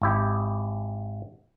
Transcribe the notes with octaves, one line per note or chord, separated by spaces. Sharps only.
G#1 E4 G4